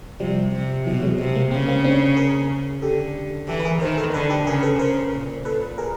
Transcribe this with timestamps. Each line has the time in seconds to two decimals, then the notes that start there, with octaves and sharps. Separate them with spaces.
0.20 C3 F3 G3
0.53 C3
0.86 B2 E3 F#3
1.03 F#3 G#3
1.19 C3
1.35 G#3 A#3
1.51 C#3 A#3 C4
1.68 A#3 C4
1.84 C4 D4
2.17 G#4 A#4
2.82 D3 G4 A4
3.48 E3 G4 A4
3.60 B4
3.65 G#4 A#4
3.81 D#3 A#4 C5
3.97 A4 B4
4.13 D3 A4 B4
4.30 G4 A4
4.47 C#3 G#4 A#4
4.63 A4 B4
4.79 C#3 A#4 C5
5.13 A#2
5.45 A#2 A4 B4
5.78 G#4 A#4